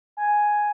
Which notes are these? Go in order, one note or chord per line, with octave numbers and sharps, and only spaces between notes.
G#5